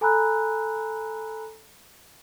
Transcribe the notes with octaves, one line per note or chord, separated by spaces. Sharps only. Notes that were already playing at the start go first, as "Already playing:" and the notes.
A4 G#5 A#5 B5 E6 F#6